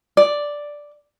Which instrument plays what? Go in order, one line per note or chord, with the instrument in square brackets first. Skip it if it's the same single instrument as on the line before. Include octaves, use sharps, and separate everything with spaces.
[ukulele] D5